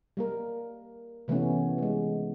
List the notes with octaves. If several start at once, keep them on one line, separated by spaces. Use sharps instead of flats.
G3 A#3 A#4
C3 E3 A3 B3 C#4
E3 G#3